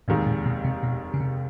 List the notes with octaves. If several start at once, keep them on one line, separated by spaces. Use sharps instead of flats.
F1 D#2 A2 D#3 G#3
A#2
B2
C3
B2
C#3
C3